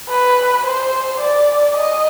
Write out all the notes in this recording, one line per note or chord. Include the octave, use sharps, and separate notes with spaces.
B4
C5
D5
D#5